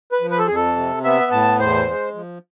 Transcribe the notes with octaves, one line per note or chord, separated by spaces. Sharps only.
B4
F3
B4
A4
F2 G#4
A4
C3
B3 E5
A2 A5
E2 C5
G#3
F3